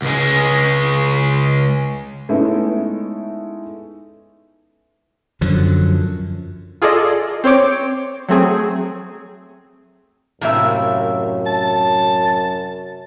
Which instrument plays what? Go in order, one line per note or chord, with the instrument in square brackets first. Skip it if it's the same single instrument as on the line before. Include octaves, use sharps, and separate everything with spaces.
[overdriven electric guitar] C#2 G#3
[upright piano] G#3 A3 B3 C#4 D#4 E4
[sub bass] F#2 [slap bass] D3 F3 F#3
[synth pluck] F4 G#4 A4 D5 D#5
C4 C5 C#5 D6 D7
F#3 A3 C4 G#4
[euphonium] F#2 [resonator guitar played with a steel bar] A2 E5 [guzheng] C3 A#3 A#4
[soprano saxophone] A5